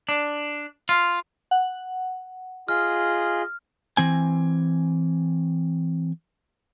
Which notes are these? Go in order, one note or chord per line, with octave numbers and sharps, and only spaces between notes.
D4
F4
F#5
F4 G#4 D#5 F6
E3 C4 G#5